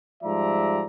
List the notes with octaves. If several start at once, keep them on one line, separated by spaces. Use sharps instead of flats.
G#2 F3 G3 D5 E5 A#5